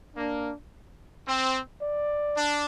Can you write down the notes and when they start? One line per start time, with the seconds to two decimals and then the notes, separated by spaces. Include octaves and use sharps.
0.16 A#3 D4
1.27 C4
1.82 D5
2.36 D4